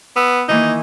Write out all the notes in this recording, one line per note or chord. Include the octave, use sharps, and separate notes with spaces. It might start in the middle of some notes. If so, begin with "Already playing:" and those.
B3 E6
D#3 E3 A#3 D#4